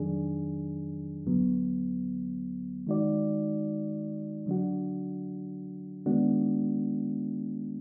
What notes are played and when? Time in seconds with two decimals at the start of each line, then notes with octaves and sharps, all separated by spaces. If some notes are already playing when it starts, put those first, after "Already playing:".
Already playing: F2 D#3 F#3 D4 G#4
1.26 D2 D3 F#3 B3
2.87 D#3 G#3 D#4 F#4 D5
4.46 D3 F#3 D4 F#4
6.06 D#3 G#3 B3 D4 F#4